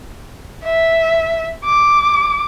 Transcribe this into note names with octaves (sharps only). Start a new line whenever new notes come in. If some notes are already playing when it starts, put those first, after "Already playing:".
E5
D6